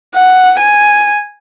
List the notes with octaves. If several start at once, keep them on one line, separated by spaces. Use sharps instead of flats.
F#5
G#5